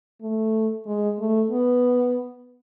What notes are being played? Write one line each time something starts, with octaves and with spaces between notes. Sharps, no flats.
A3
G#3
A3
B3